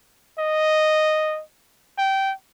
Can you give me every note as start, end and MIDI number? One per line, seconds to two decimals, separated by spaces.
0.39 1.41 75
1.98 2.33 79